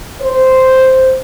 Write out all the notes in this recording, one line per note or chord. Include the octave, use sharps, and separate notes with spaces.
C5